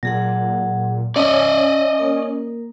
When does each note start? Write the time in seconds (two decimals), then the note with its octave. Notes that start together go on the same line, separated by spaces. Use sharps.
0.03 A#2 F#3 G#4 F#5
1.16 C#4 D5 D#5 A5 E6
1.99 A#3 A#4